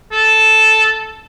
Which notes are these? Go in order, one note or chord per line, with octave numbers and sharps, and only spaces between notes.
A4